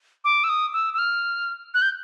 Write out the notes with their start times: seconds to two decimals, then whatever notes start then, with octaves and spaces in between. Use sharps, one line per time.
0.25 D6
0.44 E6
0.49 D#6
0.73 E6
0.94 E6
0.99 F6
1.74 F#6
1.82 G6